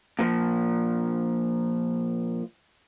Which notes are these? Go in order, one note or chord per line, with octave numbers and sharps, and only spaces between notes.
A#2 F3